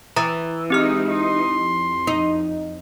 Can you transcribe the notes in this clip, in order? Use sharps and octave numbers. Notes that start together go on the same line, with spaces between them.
E3 A#5 D#6 A6
G#3 C4 D#4 E4 G4 F6
D#4 C6
F2
D#4